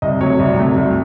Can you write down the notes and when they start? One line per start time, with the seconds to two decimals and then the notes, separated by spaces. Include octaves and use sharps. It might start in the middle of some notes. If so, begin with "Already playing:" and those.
0.02 C2 D#5
0.21 C3 F#3 A3 C#5
0.39 C2
0.58 C3 F#3 A3
0.76 C2